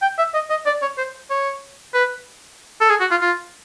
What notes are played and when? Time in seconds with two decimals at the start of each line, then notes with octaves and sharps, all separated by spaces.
0.02 G5
0.18 E5
0.34 D#5
0.50 D#5
0.66 D5
0.82 C#5
0.98 C5
1.30 C#5
1.94 B4
2.81 A4
2.90 G#4
3.00 F#4
3.11 F4
3.21 F4